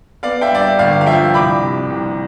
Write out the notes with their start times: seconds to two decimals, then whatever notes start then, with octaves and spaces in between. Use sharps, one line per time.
0.23 B3 D5 F5
0.41 E5 G5
0.51 G2 D5
0.61 E5
0.79 G1 D5 F5
1.01 F5
1.06 F3 E5 G5
1.34 C2 B5 D6
1.62 C3
1.90 C2